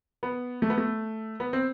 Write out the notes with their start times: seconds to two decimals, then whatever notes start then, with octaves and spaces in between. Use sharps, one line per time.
0.23 B3
0.62 A3
0.70 B3
0.78 A3
1.40 B3
1.53 C4